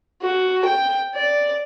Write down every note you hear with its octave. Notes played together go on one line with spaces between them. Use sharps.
F#4
G5
D5